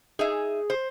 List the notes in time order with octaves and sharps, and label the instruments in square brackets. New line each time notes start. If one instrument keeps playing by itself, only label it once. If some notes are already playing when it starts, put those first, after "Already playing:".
[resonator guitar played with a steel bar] D#4 E5 [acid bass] G#4
[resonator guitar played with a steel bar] C5